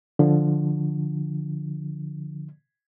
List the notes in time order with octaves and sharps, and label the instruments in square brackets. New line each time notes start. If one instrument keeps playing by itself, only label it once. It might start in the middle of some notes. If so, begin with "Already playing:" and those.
[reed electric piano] D3 F3